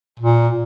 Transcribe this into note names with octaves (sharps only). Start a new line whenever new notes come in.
A#2